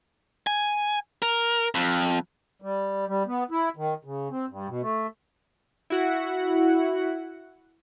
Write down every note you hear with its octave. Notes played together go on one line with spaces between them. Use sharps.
G#5
A#4
F2
G3
G3
B3
E4
D#3
C#3
C4
G2
B2
A3
E4 F#4 F#5